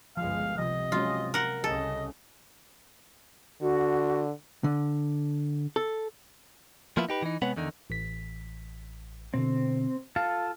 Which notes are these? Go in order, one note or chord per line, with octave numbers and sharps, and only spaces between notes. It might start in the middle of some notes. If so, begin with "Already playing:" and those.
G1 C#2 F3 G#3 F5
C3 F3 D#5
F#3 G#3 C#4 F4
A#4 F#5
C2 C#3 G#4 A4 D#5
D3 F#4
D3
A4
F3 A#3 B3 E4 F4
D#4 G4 B4
E3 D#4
C3 G#3 B3 B4 C#5 F#5
E2 D3 D#3 D#4
A1 B6
B2 D3 C4
F4 A4 F5 A5